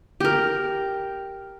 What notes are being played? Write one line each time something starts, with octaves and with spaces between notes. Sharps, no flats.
G4 A#4